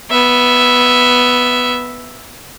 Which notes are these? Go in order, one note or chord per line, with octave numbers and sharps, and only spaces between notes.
B3 E5